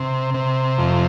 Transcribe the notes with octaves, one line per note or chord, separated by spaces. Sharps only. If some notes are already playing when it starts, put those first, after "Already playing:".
Already playing: C3
C3
F2